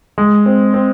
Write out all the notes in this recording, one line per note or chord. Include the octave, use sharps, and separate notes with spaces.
G#3
C4
C4